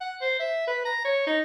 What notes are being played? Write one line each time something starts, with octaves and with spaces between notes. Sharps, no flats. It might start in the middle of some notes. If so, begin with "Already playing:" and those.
F#5
C5
E5
B4
A#5
C#5
D#4